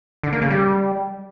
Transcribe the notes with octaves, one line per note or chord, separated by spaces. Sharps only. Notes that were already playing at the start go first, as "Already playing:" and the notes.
D3
A#3
C#3
G3